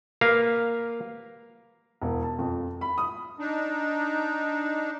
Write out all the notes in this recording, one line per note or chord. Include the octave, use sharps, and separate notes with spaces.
A#3 B4 F5
E1
A5
F2
B5
D#6
D4 D#4